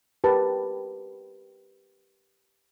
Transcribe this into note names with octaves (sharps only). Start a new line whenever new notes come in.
G4 A#4 B4 A5